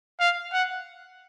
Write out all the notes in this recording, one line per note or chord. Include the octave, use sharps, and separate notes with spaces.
F5
F#5